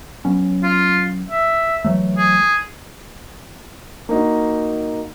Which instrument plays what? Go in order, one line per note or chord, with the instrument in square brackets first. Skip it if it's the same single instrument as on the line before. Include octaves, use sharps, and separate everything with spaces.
[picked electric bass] F#3 B3 C#4
[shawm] F4
E5
[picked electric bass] E3 F#3 A3
[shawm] G#4
[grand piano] A#3 D#4 F#4